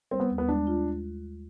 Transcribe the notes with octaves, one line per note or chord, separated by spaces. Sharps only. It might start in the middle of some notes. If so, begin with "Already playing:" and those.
G3 C4
B3
D#2
B3
G#3 D4
F4